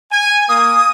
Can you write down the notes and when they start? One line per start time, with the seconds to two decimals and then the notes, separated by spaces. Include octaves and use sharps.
0.12 G#5
0.49 A#3 D#6